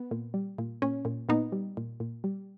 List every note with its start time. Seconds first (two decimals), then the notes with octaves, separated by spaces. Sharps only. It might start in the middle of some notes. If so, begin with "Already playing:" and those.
Already playing: B3
0.11 A#2
0.34 G3
0.59 A#2
0.82 A#2 C#4
1.05 A#2
1.29 A#2 B3 D#4
1.52 G3
1.77 A#2
2.00 A#2
2.24 G3